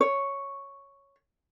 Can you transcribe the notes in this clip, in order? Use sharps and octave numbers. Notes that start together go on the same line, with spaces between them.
C#5